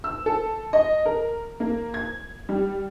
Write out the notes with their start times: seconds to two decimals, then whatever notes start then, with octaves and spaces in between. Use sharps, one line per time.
0.04 E6
0.26 A4
0.73 D#5
1.05 A#4
1.60 A#3
1.94 G#6
2.49 G3